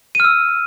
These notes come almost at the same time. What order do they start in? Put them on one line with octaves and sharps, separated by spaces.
D#7 F6 E6